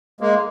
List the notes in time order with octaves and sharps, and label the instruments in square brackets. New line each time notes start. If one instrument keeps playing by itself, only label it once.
[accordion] G#3 A#3